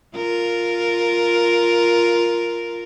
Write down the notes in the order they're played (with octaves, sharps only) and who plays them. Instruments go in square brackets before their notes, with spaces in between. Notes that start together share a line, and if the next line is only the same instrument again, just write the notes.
[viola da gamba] F4 A#4